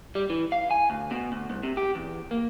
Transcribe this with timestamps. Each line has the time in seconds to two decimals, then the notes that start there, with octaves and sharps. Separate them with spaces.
0.15 G3
0.30 E3
0.52 F5
0.71 G#5
0.90 D2
1.11 B2
1.32 D2
1.50 C2
1.63 C3
1.77 G4
1.95 E2
2.31 A#3